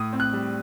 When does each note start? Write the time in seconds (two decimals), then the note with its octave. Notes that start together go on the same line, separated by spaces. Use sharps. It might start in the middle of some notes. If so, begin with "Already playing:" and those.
Already playing: A2 D#6
0.13 C4
0.20 F#6
0.33 G3